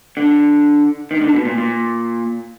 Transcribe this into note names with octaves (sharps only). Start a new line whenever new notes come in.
D3
D#3
D3
B2
A#2
A#2